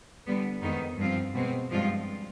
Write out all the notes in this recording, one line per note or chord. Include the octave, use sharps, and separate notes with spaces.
D3 G3 B3
F2 D#3 G#3 B3 D#4
G2 F3 C4 F4
B2 G#3 C4
G2 F3 G#3 C4 F4